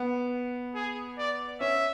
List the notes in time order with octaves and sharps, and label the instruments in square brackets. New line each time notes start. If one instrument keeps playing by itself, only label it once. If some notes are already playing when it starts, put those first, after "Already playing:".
Already playing: [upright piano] B3
[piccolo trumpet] G#4
D5
[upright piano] C#4 [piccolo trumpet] E5